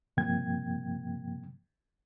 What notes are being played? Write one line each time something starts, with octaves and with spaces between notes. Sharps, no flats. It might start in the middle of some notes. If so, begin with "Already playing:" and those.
G2 C3 F3 A#3 G5 G#6